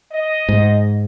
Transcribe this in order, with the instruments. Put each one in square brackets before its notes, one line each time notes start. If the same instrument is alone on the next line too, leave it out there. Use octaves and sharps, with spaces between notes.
[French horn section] D#5
[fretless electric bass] G#2